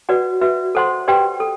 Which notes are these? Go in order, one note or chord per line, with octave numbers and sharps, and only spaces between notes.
F#4 B4 D5 F#5
F#4 B4 E5
A4 C5 F#5 C6
G4 B4 D5 G5 C6
A4